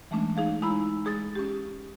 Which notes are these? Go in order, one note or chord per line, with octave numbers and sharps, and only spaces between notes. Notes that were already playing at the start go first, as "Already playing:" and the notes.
E3 G#3 A3 C#4 D4
D#4 G#4 F5
G#3 D#4 E4 A#5 B5 E6
G#3 G#4 D#6 A6
C#4 G4